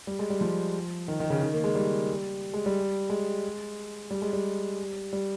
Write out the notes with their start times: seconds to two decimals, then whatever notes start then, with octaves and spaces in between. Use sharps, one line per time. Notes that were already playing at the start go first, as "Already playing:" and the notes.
0.07 G3
0.19 G#3
0.30 G3
0.41 F3
1.08 D#3
1.20 D#3
1.30 C#3
1.43 D#3
1.53 A#3
1.64 G#3
1.75 G3
2.54 G#3
2.66 G3
3.10 G#3
4.11 G3
4.22 G#3
4.33 G3
5.13 G3